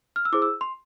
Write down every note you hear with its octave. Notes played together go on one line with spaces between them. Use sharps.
F6
E6
E4 G#4 C5 D6
E6
C6